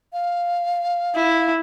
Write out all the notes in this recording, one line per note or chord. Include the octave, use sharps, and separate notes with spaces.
F5
E4